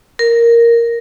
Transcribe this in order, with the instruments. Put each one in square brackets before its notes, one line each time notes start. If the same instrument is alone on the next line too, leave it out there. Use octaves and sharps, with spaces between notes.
[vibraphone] A#4